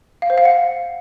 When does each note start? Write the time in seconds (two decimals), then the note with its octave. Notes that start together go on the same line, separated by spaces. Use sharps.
0.22 F5
0.30 C5
0.38 F5
0.45 F#5